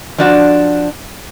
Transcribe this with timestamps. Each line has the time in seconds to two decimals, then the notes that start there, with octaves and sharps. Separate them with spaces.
0.18 F3 D4 F#4